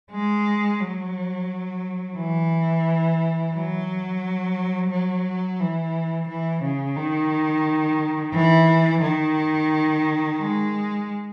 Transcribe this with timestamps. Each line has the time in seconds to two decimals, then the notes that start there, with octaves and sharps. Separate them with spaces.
0.11 G#3
0.80 F#3
2.17 E3
3.54 F#3
4.91 F#3
5.60 E3
6.28 E3
6.62 C#3
6.96 D#3
8.33 E3
9.01 D#3
10.39 G#3